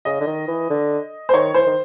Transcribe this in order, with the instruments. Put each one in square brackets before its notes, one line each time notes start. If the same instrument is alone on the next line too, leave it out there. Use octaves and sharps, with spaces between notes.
[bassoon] C#3 [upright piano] D#5
[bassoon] D3
D#3
E3
D3
[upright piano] C5
[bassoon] D#3 [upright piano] C#5
[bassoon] E3 [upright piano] C5
[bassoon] D#3